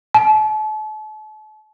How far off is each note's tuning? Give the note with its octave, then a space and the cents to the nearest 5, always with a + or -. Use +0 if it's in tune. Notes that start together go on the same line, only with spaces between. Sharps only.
A5 -40